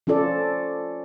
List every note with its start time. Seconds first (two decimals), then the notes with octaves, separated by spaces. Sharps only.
0.07 F3 C#4 F4 A4 D5